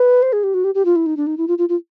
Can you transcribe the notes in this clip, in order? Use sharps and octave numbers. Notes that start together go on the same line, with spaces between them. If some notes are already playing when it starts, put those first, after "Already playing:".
Already playing: B4
C5
G#4
G4
F#4
G4
G4
F4
E4
D#4
D4
D#4
E4
F4
F4
F4